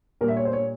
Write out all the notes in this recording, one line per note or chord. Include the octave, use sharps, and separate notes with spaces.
A#2 G3 A#4
E5
C#5
C5
C#5